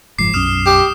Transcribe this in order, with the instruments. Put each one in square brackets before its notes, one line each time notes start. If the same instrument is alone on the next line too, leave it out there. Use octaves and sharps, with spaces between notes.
[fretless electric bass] F#1 G#2 F3 [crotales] D6 C7
[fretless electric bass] B1 F#2 C#4 [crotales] D#6 F6 E7
[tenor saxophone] G4